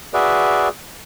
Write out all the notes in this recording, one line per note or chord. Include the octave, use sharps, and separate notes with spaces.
F#4 G#4 B4 D5 E5